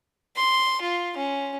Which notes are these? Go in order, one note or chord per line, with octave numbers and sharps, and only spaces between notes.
C6
F4
C#4